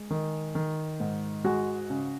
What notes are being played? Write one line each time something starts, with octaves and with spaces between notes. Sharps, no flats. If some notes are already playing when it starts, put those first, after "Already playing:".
Already playing: G#3
D#3
D#3
G#2
G#3 F#4
C#3